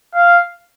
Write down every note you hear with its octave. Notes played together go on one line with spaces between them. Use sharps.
F5